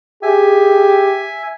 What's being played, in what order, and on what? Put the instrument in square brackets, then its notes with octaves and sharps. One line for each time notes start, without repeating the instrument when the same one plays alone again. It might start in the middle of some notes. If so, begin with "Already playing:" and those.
[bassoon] G4 [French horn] G#4 [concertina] E5 G#5